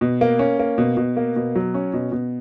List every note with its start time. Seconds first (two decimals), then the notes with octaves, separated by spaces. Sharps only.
0.01 B2
0.21 A#3
0.39 C#4
0.59 A#3
0.78 B2
0.97 B2
1.17 A#3
1.36 B2
1.55 F#3
1.74 C#4
1.94 B2
2.12 B2